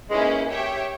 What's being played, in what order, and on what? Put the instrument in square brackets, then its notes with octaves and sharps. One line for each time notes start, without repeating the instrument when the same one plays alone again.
[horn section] G#2 G#3 [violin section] A#3 C#4 E4 G#4 B4
[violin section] G4 C#5 E5 G5